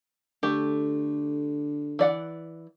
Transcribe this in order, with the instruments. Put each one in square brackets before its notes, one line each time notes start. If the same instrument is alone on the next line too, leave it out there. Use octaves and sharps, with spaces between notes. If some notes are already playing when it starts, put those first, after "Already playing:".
[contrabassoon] D3 [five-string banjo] A3 G4
[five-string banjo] E3 D5 F#5